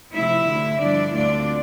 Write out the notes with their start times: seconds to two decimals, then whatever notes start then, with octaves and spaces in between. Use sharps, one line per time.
0.13 C3 F3 A3 E4 E5
0.46 D2 D3 A3
0.80 G2 D3 F3 B3 D4 E4 D5
1.13 D2 D3 A3 C4 D4 F4 D5